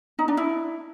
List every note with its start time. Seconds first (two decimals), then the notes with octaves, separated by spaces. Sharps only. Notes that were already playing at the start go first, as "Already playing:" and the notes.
0.19 D#4
0.28 D4
0.37 E4